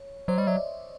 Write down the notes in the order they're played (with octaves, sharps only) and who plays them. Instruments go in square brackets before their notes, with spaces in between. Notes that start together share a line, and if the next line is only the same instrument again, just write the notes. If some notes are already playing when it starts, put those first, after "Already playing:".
Already playing: [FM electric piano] C#5
[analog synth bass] F#3 [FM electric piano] C5 D5
[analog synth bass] G3 [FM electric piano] C#5 D#5
[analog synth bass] F#3 [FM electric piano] D5 E5